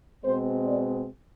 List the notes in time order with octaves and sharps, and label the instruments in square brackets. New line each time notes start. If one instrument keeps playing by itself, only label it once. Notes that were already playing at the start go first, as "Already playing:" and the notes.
[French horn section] B2 G#3 C4 C5
D5